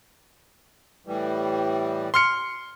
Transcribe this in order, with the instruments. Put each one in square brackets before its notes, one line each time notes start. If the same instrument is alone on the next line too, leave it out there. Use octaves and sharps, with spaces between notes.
[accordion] A2 E3 G3
[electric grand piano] C6 F6 C#7